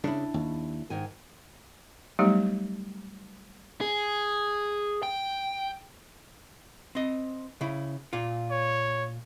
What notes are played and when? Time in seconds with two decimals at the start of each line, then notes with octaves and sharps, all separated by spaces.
0.04 C#3 D4 E4
0.34 D#2
0.90 G#2 D#3 G#5
2.19 F#3 G3 A3 B3 D#4 G4
3.81 G#4
5.03 G5
6.95 C4 D#5
7.61 C#3 E4
8.13 A#2 F4
8.51 C#5